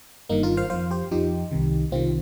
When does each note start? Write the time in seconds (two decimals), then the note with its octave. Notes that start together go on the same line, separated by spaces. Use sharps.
0.29 G1 G2 D#3 A#3 D#4
0.43 F4 A#4
0.57 C5 F5
0.70 F2 F3 C5 F5
0.91 G4 C5
1.11 F2 F3 D#4 G4
1.51 C2 C3 D#3
1.92 C2 C3 D#3 C4 F4